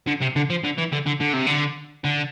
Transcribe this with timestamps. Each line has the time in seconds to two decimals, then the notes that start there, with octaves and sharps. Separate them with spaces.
0.08 D3
0.22 C3
0.36 D3
0.50 F3
0.64 D3
0.78 E3
0.92 D3
1.06 D3
1.20 D3
1.33 C3
1.47 D3
2.05 D3